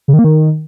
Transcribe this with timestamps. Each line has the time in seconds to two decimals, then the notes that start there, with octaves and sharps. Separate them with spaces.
0.08 C#3
0.13 D#3
0.19 A#3
0.24 D#3